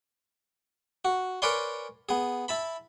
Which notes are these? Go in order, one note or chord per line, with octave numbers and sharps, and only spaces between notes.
F#4
A#4 B4 C#5 D5 G#5 C6
B3 G#4
E4 A5 B5